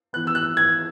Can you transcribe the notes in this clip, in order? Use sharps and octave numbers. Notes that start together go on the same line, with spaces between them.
E3 B3 F#6
E6
F#6
G#6